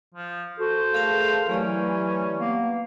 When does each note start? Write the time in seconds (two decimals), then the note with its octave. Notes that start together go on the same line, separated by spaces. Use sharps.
0.14 F3
0.59 F#4 A4 C5
0.94 A3 G#4 A#4 F5 A5
1.49 E3 F#3 A3 C#4 G4 D5
2.38 A#3 B3